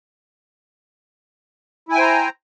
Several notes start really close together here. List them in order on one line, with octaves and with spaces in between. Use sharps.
E4 G#5 G5 C5 A#5